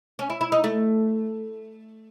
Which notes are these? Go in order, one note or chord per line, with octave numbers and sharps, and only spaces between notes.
C#4
E4
E4
D#4
A3